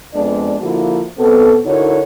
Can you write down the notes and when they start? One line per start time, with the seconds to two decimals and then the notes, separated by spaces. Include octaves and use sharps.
0.14 F2 G#3 B3 D4 D5
0.61 D3 F3 A#3 E4 F#4
1.18 B2 B3 C4 A4
1.65 D3 D#4 E4 F#4 A#4 C#5